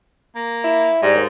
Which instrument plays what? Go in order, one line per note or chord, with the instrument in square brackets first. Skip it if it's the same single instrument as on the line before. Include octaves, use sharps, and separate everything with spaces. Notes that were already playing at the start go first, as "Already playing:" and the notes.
[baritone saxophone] A#3
[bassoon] E4
[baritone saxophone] G#2 [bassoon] G3
[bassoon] D#2